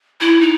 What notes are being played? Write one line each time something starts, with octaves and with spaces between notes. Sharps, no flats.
E4
D#4